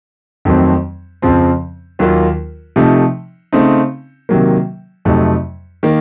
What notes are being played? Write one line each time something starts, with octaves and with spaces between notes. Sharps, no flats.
F2 D#3 F#3 A3 C4
F2 C#3 F3 C4
D#2 D#3 F#3 A#3 F4
C3 F3 A3 D#4
C#3 A3 C4 D#4
C3 D#3 F#3 A#3
F2 C3 F#3 A3 D#4
D#3 A#3